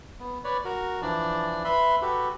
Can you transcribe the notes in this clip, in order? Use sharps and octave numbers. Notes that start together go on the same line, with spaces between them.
B3
B4 C#5 D5
F#4 A#4
E3 F3 D4 D5
B4 E5 B5 C6
F#4 G4 A4 B4